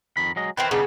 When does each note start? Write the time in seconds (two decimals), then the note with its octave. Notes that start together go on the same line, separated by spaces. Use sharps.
0.17 F2 D#3 B5
0.36 F#3 G#3 D#5
0.57 D#3 E3 C4 B4
0.71 C#3 G3 B3 D4 D#4